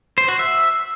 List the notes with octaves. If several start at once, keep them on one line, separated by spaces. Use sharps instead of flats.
C5
F#4
E5